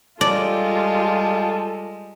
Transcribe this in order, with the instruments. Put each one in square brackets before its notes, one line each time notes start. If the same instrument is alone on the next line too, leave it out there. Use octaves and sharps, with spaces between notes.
[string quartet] G3 G#3 [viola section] F4 G4 [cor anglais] A4 [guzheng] D5